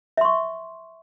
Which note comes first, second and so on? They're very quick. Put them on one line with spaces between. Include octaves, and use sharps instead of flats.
E5 C6 C#6